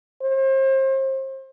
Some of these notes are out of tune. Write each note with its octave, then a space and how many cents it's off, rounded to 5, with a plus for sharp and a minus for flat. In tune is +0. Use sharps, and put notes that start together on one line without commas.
C5 +35